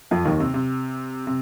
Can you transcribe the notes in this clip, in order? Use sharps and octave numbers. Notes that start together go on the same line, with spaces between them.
F2 F3
D#2 D#3
C3
C3
C3